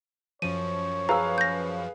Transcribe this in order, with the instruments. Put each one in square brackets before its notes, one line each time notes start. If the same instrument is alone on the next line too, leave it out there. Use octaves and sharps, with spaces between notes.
[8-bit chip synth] F#2 F3 [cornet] C#5 [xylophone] D#7
[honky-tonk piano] G#4 B4 F5 [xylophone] A#5 E6
[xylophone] G6 A#6